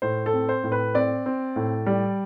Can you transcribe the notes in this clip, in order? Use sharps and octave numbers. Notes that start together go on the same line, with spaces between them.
A2 C5
A4
C4
C5
A2
B4
C4 D5
C4
A2
G3